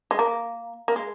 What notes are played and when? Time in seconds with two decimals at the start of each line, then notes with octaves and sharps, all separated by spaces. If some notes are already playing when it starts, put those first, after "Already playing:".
0.11 G#3
0.19 A#3
0.88 A#3
0.96 G#3